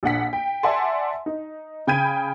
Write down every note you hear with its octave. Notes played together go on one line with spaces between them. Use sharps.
A#1 D4 F#5 B6
G5
D5 E5 F#5 G#5 A5 C6
D#4
C#3 G5 B5 G6 G#6 D#7